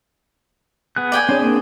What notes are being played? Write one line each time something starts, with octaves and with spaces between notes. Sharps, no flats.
B3 G#4 F#6
D5 G5 G#5
C4 D4 G#4 C#5
A#3